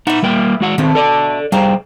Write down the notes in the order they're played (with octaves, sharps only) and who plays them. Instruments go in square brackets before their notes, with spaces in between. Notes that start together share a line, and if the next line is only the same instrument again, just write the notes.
[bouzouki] B3 E4 [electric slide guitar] D#4 F#5
[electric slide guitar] G3 A#3 G5
G#3 F#4 F#5
[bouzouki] B2 A3 [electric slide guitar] D#3 C4
[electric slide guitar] A4 D5
[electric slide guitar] G3 G#4 C5 [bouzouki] F5 G5 A#5